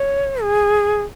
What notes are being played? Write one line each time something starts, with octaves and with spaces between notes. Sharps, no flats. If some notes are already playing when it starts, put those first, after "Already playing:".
Already playing: C#5
G#4